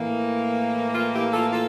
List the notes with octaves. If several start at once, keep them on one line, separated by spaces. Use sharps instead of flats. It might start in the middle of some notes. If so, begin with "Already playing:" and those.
Already playing: A2 E3 A#3
F4
E4 G4
F4 A4
F4 A4